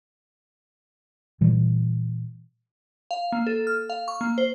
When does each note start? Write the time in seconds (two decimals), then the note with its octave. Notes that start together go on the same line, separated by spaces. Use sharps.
1.41 A#2 E3 G3
3.11 F5
3.32 A#3
3.47 A4
3.67 F6
3.90 F5
4.08 C#6
4.21 A#3
4.38 C5